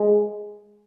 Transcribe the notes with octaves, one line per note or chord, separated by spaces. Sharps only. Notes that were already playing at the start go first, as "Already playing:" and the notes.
Already playing: G#3